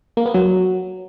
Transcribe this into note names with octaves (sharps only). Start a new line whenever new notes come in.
A#3
B3
F#3